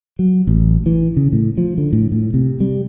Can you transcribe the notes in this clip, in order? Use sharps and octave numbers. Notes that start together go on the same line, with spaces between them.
F#3
A1
E3
C#3
A2
F3
D3
A2
A2
C3
G3